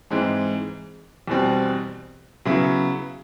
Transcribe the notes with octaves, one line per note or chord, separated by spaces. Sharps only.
G#2 E3 G#3 C4
E2 B2 G3 C4
C#3 F#3 B3 E4